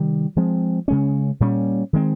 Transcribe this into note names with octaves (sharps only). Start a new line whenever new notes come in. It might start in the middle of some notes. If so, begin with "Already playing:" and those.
Already playing: C3 D#3 G3
F3 G#3 C4
C#3 G#3 C#4
A#2 G3 A#3 C#4
D#3 G#3 C4